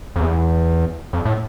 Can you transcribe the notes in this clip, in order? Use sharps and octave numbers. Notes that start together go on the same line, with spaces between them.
F2
E2
F2
A2